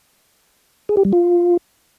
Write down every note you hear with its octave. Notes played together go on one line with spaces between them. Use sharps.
G#4
G4
G3
F4